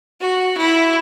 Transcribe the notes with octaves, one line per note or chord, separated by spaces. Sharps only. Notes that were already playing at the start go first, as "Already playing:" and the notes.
F#4
E4